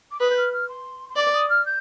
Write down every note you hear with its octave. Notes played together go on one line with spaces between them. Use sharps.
D6
B4 D#6
G6
F6
F6
C6
C6
D5 D6
D#6
F6
G6